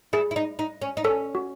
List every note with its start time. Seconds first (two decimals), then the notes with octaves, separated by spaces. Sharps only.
0.13 E4 G#4
0.31 E4
0.36 D#4
0.59 D#4
0.82 C#4
0.97 D#4
1.04 C#4 A4
1.35 F#4